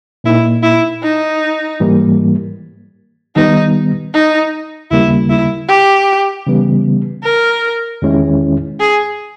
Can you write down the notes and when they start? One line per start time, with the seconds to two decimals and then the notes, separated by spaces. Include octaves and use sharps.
0.24 A#2 A#3 D#4 E4
0.63 E4
1.03 D#4
1.80 G#2 E3 G3 A#3
3.36 D#3 G3 B3 D#4
4.14 D#4
4.91 D#2 C#3 G3 A#3 E4
5.29 E4
5.69 G4
6.46 C#3 E3 G3 B3
7.24 A#4
8.02 E2 D#3 G#3 C#4 E4
8.80 G#4